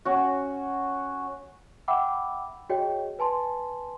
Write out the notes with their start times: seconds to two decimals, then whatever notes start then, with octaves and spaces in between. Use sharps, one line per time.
0.05 C#4 F#4
1.88 E5 F#5 G5 B5 D6 E6
2.70 F#4 G#4 C#5 D#5 G5
3.19 B4 G#5 A5 C6